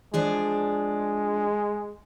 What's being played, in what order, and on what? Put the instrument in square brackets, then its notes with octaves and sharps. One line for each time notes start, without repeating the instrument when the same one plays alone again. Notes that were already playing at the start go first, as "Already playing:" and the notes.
[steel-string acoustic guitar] F3 D4 G#4 [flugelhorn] G#3